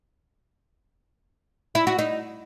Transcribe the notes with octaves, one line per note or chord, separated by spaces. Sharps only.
E4
F#4
D#4